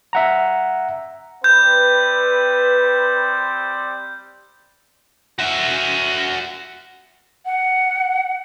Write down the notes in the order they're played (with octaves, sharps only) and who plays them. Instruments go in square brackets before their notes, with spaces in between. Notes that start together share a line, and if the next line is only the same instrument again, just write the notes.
[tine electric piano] E5 F#5 A#5
[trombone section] G3 C4 [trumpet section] B4 [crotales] G6
[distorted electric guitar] F#4 E5
[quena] F#5